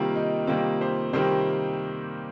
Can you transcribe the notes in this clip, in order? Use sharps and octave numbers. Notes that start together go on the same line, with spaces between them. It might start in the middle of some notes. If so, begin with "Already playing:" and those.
Already playing: C3 D#3 G3 A#3 F4
D#4
C3 D#3 G3 A#3 F4
G4 C5
C3 D#3 G3 A#3 G4 C5